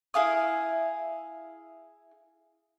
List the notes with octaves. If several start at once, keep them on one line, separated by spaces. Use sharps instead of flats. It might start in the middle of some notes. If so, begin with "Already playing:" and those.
E4 G#4 F5 D#6